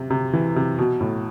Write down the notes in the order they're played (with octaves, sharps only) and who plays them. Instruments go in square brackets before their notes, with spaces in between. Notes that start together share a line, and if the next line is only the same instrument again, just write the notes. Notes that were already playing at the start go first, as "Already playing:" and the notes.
Already playing: [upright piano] C3
C3
E3
C3
B2
A2